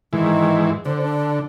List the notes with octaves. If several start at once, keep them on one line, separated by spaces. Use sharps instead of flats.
G#2 D#3 E3
D3 C5
D4